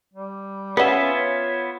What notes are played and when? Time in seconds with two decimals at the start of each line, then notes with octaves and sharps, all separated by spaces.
0.13 G3
0.77 B3 C#4 F4 B4 E5 F#5
1.13 C#5